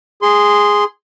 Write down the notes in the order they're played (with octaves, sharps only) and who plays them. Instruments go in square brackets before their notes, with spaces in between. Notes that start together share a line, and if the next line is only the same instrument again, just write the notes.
[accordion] G#4 C6